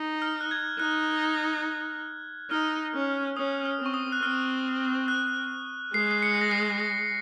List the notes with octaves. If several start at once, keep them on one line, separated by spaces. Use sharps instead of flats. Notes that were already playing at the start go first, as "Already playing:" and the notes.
Already playing: D#4
F6
F#6
G#6
D#4 F#6
D#4 F6
C#4
C#4 D#6
F6
C4
C#6
D#6
F#6
C4 F6
F#6
G#3 C7
C7
C#7
A#6
C7
A#6